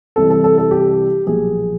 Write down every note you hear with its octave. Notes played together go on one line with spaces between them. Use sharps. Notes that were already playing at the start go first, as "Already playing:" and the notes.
C2 C3 E3 G3 A4
A4
A4
A4
G4
B1 A#2 F3 G#4